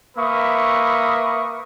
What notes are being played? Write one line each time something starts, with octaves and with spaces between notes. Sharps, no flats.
A#3 B4 E5 C#6 D#6